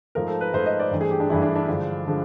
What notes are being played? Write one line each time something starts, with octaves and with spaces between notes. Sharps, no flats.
G#2 F3 A3 A#4
A4
B4
G#2 F3 A3 C5
D#5
D5
G2 E3 A3
G#4
G4
D4
G2 E3 A3 E4
D4
D4
G2 D3 F3 G#3
D3 F3 G#3